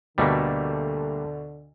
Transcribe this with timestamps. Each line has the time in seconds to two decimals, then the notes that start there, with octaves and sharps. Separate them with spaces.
0.18 D2 B2 D3 G3 A3 A#3 A4